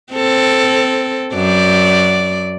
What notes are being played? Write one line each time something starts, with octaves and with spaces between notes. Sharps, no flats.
C4 A4
F#2 D5